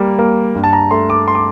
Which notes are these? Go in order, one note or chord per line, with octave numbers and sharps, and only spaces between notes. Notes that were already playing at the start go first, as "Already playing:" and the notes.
Already playing: G3 A#3
A#3
G2
A5
A#5
A3 C6
D6
C6
D6